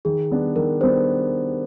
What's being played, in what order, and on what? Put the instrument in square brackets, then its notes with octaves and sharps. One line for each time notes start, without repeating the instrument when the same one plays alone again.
[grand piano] D#3 [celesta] G#4
[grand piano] G3 B3 D4
[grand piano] D#3 [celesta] A#4
[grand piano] G3 B3 D4 [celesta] C5